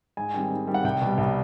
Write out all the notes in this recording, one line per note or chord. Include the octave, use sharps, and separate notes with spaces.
G#2 G#5
D#3 G3 C4
G#2
D#3 G3 C4
F#5
C2 G5
B2 G3
C2